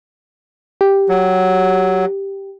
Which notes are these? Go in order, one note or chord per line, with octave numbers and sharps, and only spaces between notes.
G4
F#3